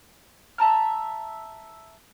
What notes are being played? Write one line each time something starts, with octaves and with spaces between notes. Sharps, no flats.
E5 A5 A#5 F6